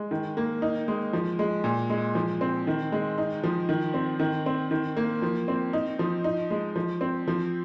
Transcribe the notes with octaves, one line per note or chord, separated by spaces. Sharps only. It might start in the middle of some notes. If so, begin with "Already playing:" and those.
Already playing: G#3
D#3
A#3
D#4
G#3
F3
G#3
A#2
G#3
F3
C4
D#3
G#3
D#4
F3
D#3
C4
D#3
C4
D#3
A#3
F3
C4
D#4
F3
D#4
G#3
F3
C4
F3